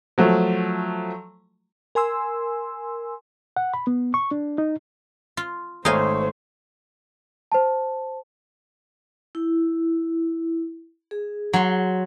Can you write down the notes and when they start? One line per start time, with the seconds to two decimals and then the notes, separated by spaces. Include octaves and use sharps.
0.18 F3 F#3 A3
1.95 A#4 G#5 C6 E6
3.57 F#5
3.74 B5
3.87 B3
4.14 C#6
4.31 D4
4.58 D#4
5.37 F4
5.85 G#1 A3 D#4 C5 C#5 F5 G#5
7.52 C5 A5
9.35 E4
11.11 G#4
11.53 F#3 C6